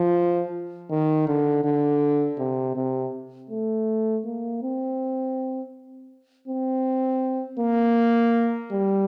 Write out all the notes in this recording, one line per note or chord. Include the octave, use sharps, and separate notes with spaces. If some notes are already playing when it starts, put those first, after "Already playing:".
Already playing: F3
D#3
D3
D3
C3
C3
A3
A#3
C4
C4
A#3
G3